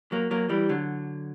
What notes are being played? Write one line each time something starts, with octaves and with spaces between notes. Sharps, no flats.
F#3 A#3
F#3 A#3
E3 G3
D3 F#3